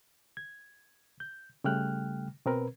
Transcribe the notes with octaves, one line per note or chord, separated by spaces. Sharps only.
G#6
G6
C#3 G3 A3 G5 F6 F#6
B2 C4 A#4 B4